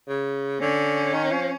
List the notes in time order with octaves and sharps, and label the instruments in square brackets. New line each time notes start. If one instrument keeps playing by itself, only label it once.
[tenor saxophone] C#3
[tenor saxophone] D3 [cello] C#4
[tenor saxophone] D#3
F3